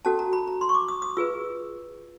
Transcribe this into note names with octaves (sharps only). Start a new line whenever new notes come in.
C#4 F#4 A4 A5
A#5
B5
A#5
C6
C#6
D6
D#6
D#6
F4 G#4 B4 E6